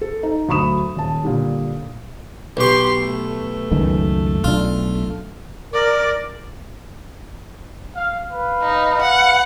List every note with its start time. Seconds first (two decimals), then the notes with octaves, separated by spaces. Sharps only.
0.01 A4
0.23 D#4
0.49 D2 F#3 B5 C#6 D#6 E7
0.96 D#1 A5
1.23 A#2 D3 G3
2.57 B1 G4 C6 C#6
2.99 A3
3.71 C#2 F#2 D#3
4.44 B1 D4 F4
5.74 A#4 D5
7.96 F5
8.29 B4 F5
8.62 D#4
9.01 F#5